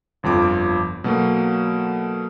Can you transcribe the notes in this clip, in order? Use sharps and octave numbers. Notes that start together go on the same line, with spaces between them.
G1 F2 F3 D6
B2 F#3 A3 A#3